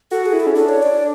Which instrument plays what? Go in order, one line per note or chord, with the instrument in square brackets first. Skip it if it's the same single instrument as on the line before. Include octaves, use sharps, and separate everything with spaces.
[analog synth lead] F#4 [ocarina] A4
[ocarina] G#4
[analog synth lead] E4
[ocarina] A4
[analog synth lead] C#4
[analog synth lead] D4 [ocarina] A4
[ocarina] C#5
D5